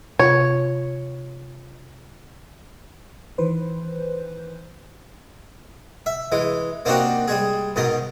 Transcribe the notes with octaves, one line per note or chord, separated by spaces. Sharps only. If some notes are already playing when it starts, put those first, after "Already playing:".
C3 F4 C#5
D#3 E3 B4 C5
E5
E3 G#3
A#3 C4 D4 D#4 F#4 G4
G3 G#3 G#4
G#2 B2 D#3 D#5